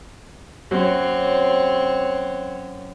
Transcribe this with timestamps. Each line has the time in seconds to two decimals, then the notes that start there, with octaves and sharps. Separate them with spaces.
0.71 F#2 C4 C#5